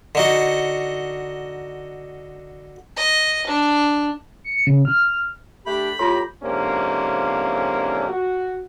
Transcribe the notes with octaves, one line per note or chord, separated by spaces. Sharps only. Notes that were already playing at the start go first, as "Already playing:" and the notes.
D3 D#4 F#4
D#5
D4
C#7
C#3
F6
A3 D4 G4 B5
A2 F4 G4 A#5 C6
F2 G#2 C3 A#3 C#4 D4
F#4